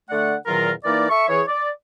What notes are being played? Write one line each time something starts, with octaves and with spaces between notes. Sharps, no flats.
D3 A3 D5 F#5
E2 A#2 D#3 F#3 F4 A#4
E3 A#3 D#4 A#4 D5
A4 E5 C#6
E3 G#4 C#5
D5